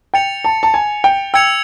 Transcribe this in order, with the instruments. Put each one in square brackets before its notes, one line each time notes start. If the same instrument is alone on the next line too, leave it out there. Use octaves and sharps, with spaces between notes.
[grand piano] G5 [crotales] A6 C#7 F7
[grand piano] A5
A5
G#5
G5
[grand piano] G5 [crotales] E6 G#6 C#7 F7